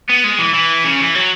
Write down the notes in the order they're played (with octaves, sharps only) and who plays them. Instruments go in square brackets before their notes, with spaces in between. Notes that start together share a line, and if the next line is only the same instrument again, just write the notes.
[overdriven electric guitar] B3
G#3
E3
E3
C#3
E3
F#3